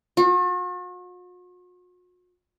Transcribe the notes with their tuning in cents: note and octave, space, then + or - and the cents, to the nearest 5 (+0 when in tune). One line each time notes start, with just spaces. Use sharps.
F#4 -45